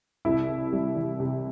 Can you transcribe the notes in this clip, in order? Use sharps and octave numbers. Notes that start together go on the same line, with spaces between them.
C2 E4
C3
G3
E3
C3